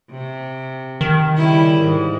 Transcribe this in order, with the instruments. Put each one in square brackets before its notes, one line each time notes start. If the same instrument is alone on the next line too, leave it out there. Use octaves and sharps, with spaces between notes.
[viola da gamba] C3
[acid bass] D#3
[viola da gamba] C#3 G3 E4
G#2